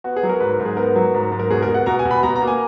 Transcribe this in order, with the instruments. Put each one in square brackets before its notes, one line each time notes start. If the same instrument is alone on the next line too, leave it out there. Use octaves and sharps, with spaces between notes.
[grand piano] B3 F#4
G#4
F#3
A#4
G#2 B4
A#4
G#2
G#4
B3 A#4
F#3
G#2
G#2
A#4
B2 G#4
A#4
B2
F#5
B2 A#5
G#5
B2
B5
B2 A#5
A#5
A#3
G#5